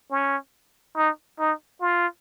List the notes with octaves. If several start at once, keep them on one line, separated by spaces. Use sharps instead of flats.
C#4
D#4
D#4
F4